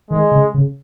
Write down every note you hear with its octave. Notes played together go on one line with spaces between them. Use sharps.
D#3 G#3
C#3
C#3